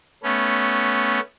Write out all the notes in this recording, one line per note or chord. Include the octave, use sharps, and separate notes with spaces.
A3 B3 C#4